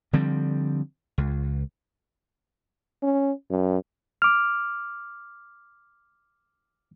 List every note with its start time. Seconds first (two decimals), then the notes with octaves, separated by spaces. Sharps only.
0.13 D3 F3 G3 C4
1.18 C#2
3.03 C#4
3.50 F#2
4.22 D6 F6